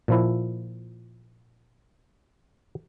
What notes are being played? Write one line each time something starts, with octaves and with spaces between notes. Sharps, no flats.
A#2 F3 E4